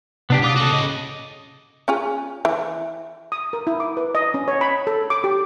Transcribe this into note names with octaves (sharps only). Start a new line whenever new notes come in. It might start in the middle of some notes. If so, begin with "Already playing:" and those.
C2 B3 D4 G4
C#3 F4 D6 D#6
F#4 A4
A2 D#5
C#4 F4 G#4
E3
D#6
A#4
E4
D6
B4
D#5
C#4
C#5
B5
A4
D6
G4